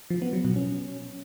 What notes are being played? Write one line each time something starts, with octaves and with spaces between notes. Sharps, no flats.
F3
B3
F#3
B2
C#4